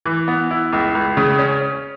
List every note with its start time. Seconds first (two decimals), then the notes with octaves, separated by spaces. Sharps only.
0.05 E3
0.28 B3
0.51 E4
0.73 C#2
0.95 C#2
1.17 C#3
1.39 C#4
1.61 C#4